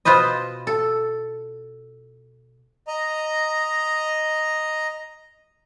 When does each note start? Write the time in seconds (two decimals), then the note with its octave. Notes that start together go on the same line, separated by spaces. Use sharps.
0.05 B2 F4 B4 C5 D#5
0.67 A4
2.87 D#5 A#5